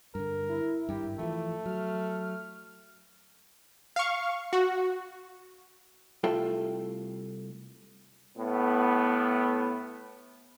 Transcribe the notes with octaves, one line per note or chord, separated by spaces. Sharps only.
G2 D3 A#4
E4
G#1 G2 G4
E3 F3 A3
F#3 F6
F5 C#6
F#4
C2 A3 F4 A4 E5 G5
A2 B3